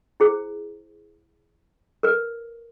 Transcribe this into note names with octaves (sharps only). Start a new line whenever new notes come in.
E4 G#4 C5
A#4 B4